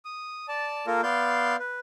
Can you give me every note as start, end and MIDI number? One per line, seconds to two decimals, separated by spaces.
0.05 0.46 87
0.48 0.86 74
0.48 0.86 81
0.87 1.01 58
0.87 1.01 65
0.87 1.01 69
0.87 1.01 70
1.03 1.56 59
1.03 1.56 74
1.03 1.56 77
1.03 1.56 84
1.03 1.56 91
1.59 1.80 71